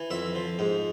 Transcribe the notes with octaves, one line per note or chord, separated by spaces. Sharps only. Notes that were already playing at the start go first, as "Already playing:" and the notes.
Already playing: E3
F2 E5
F3
G#2